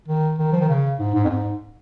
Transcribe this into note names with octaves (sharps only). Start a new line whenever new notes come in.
D#3
D#3
F3
D#3
C#3
G#2
G#2
F2
G#2